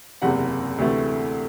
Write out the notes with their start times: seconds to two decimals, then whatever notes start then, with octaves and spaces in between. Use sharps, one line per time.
0.22 F#1 E2 C3 F#5
0.78 D2 C3 E3 A3